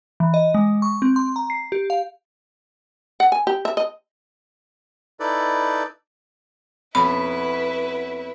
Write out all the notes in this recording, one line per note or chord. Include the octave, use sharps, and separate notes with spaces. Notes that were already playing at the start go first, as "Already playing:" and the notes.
E3
D#5
G#3
C#6
C4
C6
A#5
C7
G4
F5
F#5
G#5
G4
E5
D#5
D#4 E4 A4 B4 D5
F2 B2 C#4 E4 B4 B5